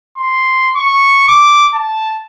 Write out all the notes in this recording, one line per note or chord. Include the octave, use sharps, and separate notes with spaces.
C6
C#6
D6
A5